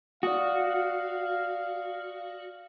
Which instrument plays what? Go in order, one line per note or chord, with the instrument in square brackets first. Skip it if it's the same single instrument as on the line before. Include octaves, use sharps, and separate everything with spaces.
[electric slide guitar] F#4 [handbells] D5 D#6 [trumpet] F5